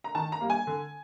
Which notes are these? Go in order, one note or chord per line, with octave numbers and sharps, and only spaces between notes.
A#5
D#3 A5
A#5
G3 A#3
G#5
D3